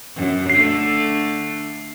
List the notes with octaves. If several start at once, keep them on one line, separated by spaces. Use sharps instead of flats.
F#2
D3 A3 C7